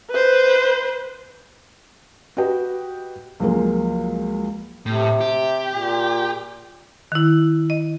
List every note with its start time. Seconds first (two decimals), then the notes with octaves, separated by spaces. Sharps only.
0.10 B4 C5
2.37 F#4 G4 B4 D#5 G5
3.40 C#2 F3 F#3 G#3 A#3
4.86 A2 C3
5.21 G4
5.75 A#2
7.12 D#3 E4
7.70 D#5